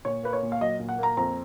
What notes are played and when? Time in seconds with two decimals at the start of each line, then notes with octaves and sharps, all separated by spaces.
0.05 A#2 C#5
0.23 A#3 B4
0.33 C#5
0.43 A#2
0.52 F5
0.61 F#3 D#5
0.79 A#2
0.89 F#5
0.98 A#3 A#5
1.17 F2 A#5